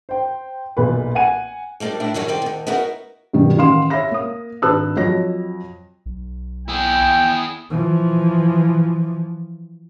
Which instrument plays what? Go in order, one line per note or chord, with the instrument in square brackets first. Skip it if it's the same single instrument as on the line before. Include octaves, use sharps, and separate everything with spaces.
[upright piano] C5 G5
B1 A#2 G#4 B4
F#5 G#5 D#7
[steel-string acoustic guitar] F3 G3 A#3 D4 D#4
A2 D4 E4
F#2 A2 D#3 F#3 G3
D#3 C4 D5
D2 D#3
B3 C#4 D#4 E4 F#4 A#4
[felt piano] G2 B2 D#3 F#3
A1 D#3 F5 C6 E7
C#5 E5 F5 B5 A#6
A#3 D#6
G#1 D4 B4 A5 E6 F#6
F2 F#3 C#5 D#5 A#6
[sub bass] B1
[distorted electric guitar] E4 G#4 [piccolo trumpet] G5
[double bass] E3 F3